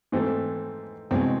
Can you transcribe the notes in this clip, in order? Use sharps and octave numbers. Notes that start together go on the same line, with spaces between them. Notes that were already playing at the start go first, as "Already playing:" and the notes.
G#2 E3 A3 C4
C2 B2 G#3 C4